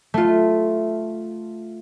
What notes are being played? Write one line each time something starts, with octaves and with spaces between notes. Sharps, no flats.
A3 F4